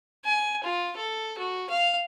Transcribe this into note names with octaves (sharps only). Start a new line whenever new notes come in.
G#5
F4
A4
F#4
F5